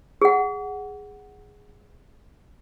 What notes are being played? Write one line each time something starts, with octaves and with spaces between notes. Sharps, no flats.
G#4 F#5